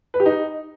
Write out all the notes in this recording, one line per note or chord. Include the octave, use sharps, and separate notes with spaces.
B4
G4
D#4